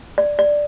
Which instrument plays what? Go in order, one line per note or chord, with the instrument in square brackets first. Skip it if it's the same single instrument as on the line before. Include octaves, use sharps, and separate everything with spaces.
[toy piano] D5
D5